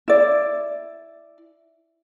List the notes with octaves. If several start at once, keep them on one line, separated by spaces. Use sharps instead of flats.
E4 D5